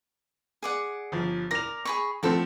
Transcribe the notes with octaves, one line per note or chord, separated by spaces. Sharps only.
G#4 D5 F#5
G1 F3
A#4 D5 A#6 F7
G#4 B5 C#6
F3 A3 C4 A4 F#5